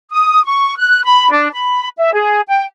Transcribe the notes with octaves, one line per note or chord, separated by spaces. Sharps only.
D#6
C#6
F#6
B5
D4
B5
E5
G#4
G5